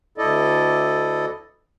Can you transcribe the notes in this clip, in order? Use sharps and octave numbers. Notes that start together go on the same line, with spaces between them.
D2 E4 A4 D5 D#5